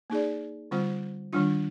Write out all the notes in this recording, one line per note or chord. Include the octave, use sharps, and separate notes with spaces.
A#3 D#4 G#4 D5
D3 G3 C4 F4 C5
D#3 G3 D4 F4